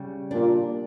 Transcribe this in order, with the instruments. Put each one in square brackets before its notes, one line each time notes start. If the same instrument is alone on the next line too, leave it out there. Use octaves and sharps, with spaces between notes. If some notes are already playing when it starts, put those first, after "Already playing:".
Already playing: [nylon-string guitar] C#3 G3
[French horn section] A#2 [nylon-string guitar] D4